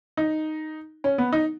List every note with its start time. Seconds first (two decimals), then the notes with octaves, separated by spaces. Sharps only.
0.17 D#4
1.04 C#4
1.18 B3
1.32 D#4